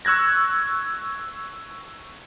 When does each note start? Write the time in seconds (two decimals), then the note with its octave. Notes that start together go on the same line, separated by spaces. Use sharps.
0.05 C#6 E6 F#6 G#6 A#6